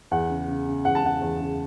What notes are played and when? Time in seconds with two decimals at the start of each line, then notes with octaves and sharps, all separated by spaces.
0.11 E2 F#5
0.30 C#3
0.48 C#3
0.67 C#3
0.85 E2 F#5
0.95 A5
1.04 C#3 F#5
1.22 E2
1.41 C#3